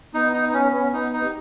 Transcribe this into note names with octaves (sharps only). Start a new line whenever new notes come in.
B3 D#4
D#4
D#4
C#4
C#4
D#4
D#4
G4